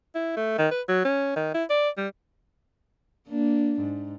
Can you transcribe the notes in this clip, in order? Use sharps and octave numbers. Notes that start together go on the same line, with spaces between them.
E4
A3
D#3
B4
F#3
C#4
D#3
E4
D5
G3
A#3 D4
G#2